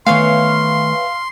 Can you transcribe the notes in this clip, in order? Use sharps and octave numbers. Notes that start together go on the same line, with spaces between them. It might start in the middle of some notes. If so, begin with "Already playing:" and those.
D#3 E3 A3 B3 C#5 F5 C6